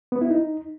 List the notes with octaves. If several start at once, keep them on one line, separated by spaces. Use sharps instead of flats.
B3
E4
D#4